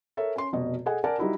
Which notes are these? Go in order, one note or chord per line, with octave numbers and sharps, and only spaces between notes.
A4 A#4 C#5 E5
C#4 C6
F1 B2 D#5
G#4 A4 D#5 F#5 G#5
A#4 D5 F#5 G#5 A5
G3 D#4 E4 F#4